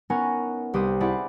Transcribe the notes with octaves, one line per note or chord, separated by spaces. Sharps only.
B3 C#4 D#4 A#4 F#5 G#5
C2 G4 B4 C5 D#6 D#7
C4 E4 G#4 D5 F#5 B5